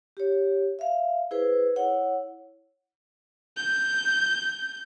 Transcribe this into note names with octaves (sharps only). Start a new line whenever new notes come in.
G4 C#5
E5 F5
E4 G#4 B4 C5
E4 C#5 F#5
G6